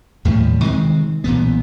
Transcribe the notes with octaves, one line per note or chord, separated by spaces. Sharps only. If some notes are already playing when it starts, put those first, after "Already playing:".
D#2 A2 F3 G3
C3 D#3 G#3 C4
B1 A#2 E3 B3